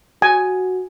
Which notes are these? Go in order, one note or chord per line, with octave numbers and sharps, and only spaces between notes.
F#4 G#5